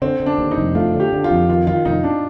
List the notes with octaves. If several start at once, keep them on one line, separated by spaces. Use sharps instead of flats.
D3 C4
D3
D4
D#2
D#4
F1
A3 F4
D3
G4
D3
F4
F2
D#3 F4
D#3 F4
F1 D#4
D4